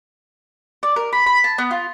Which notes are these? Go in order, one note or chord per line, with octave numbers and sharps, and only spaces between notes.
D5
A#4
B5
B5
A5
B3
F4